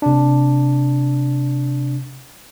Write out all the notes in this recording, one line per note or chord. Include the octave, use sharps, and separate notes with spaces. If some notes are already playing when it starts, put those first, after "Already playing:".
C3 D4